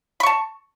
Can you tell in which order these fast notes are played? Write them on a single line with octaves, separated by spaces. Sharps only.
B5 C#6 A5